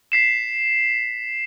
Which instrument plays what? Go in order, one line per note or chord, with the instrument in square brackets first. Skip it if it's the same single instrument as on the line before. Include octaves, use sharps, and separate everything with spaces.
[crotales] B6 C7 E7